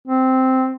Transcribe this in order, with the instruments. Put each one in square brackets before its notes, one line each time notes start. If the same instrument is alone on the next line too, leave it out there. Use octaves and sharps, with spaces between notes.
[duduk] C4